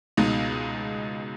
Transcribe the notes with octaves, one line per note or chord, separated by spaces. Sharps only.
C#2 B2 G#3 D#4